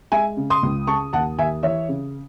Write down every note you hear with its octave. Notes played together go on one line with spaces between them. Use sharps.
G#3 E5 G#5
C#3
C6 D#6
C#2
C#3 A5 C#6
D#2 F#5 A5
D#2 E5 G#5
E3 C#5 E5
C#3